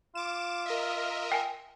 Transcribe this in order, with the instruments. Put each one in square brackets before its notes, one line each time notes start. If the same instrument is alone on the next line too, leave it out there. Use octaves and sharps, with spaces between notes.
[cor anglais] F4 [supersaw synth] D6 E7
[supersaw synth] A#4 D#5 E5
[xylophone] G5 G#5